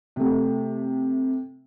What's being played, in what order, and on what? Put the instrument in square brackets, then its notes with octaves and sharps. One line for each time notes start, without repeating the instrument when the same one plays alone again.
[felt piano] C3 A3